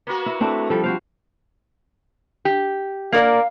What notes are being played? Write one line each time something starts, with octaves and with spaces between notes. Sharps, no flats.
A#3 B3 F#4
E4
A3 C4 D4 E4
F3 G3 A4
C4 F#4 C5 F5
G4
A#3 A#4 D5 F5